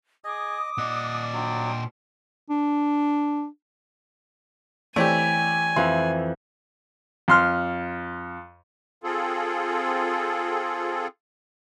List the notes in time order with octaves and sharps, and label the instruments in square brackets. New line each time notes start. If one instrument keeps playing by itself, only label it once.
[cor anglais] G#4 [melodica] D#5 [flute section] D6 D#6
[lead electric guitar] A#2 D#5 [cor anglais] D5 [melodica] F#5
[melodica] F#3 [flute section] D4 G5 C6
[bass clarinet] D4
[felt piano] E3 C#5 D5 [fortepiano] A3 C4 G4 [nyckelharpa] G#5
[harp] F2 E3 [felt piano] C6
[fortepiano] F2 C6 F6
[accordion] C4 F4 G#4 A4